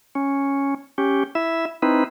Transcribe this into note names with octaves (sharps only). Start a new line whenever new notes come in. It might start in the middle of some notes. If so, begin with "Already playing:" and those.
C#4
C#4 G4
E4 E5
C4 D#4 E4 B4